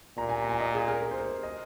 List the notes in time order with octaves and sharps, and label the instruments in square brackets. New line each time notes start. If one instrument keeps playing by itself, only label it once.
[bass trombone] A#2 [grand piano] A#5
[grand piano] G#5
A#5
G#5
D#5
G#4
A#4
A#4
C5
A#4
D#5